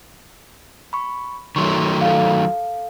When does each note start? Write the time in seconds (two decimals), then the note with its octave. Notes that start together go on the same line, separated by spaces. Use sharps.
0.93 B5 C#6
1.56 D#3 F#3 A3 C6 C#6
2.01 A4 F5